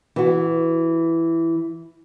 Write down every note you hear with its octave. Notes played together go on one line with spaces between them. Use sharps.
E3 F#4